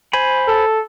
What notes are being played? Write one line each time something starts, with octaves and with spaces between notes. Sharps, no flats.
C5 G#5 B5
A4